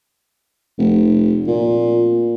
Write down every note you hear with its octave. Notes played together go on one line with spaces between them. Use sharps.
F1
A#2